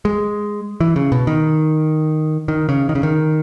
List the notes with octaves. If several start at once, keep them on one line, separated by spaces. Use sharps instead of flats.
G#3
E3
C#3
B2
D#3
D#3
C#3
D#3
C#3
D#3